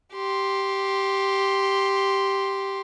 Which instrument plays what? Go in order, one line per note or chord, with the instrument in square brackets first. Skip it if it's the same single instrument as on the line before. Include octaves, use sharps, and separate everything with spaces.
[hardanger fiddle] G4 C6